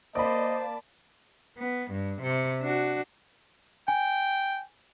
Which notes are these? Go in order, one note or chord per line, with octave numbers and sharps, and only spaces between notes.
A#3 C5 D5 D#5 A5 B5
B3
G2
C3
D4 F#4
G5 G#5